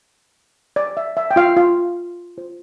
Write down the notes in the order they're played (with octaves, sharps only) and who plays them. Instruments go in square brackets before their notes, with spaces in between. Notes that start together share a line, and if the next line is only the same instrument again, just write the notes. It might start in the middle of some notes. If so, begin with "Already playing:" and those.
[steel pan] D5
E5
E5
G5
F4 F5
F4 F5
F4 C5